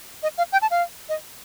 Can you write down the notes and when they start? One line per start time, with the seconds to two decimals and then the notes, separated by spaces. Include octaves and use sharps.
0.23 D#5
0.38 F5
0.52 G5
0.62 A5
0.71 F5
1.09 D#5